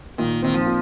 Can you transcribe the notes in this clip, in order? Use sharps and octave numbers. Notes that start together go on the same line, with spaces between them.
A#2 D#3
D#3 C4
F3
A#2